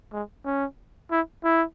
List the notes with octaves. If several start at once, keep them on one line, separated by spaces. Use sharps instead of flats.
G#3
C#4
E4
E4